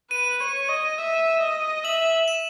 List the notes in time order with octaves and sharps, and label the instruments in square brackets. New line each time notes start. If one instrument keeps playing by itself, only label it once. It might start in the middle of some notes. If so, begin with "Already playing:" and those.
[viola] B4 [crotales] D#7
[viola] C#5
D#5
E5
D#5
[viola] E5 [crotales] F#7
[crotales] E7